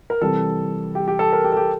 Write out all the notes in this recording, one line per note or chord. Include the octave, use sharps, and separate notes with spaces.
A#4
C3 E3 G3 A4
G4
G4
A4
A#4
G4
A4
G4